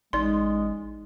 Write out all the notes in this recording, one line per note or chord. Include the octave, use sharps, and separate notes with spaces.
A1 G#3 D#4 D5 C6